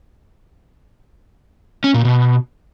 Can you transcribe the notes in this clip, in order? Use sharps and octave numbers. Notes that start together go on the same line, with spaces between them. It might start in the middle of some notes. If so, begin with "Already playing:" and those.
C#4
A#2
B2